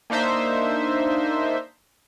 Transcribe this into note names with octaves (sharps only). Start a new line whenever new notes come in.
A#3 D4 D#4 C5 E5